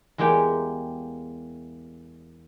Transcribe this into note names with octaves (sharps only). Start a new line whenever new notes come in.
E2 G#3 A#3 G4 G5